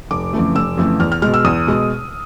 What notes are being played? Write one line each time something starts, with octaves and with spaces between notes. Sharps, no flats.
F1 D6
F2 C#3 E3 A3
F1 E6
F2 C#3 E3 A3
E2 F6
F6
B2 G#3 F6
E6
E2 D#6
B2 G#3